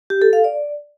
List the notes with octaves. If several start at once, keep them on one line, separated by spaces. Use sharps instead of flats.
G4
A4
F5
D5